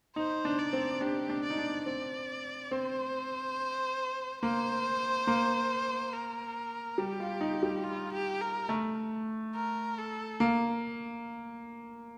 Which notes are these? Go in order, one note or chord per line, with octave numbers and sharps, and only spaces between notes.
D#4 C5
D4
D5
C4
D4 G4
D4
D5
D#4
D4
C4 D5
C4 C5
A#3 C5
A#3
A#4
G3 G4
F4
D#4
G3
F4
G4
A#4
A3
A#4
A4
A#3